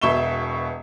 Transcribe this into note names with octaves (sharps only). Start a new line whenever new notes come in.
E1 B2 E5 C#6 E7 G7